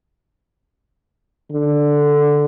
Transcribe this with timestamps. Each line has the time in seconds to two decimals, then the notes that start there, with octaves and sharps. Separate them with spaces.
1.51 D3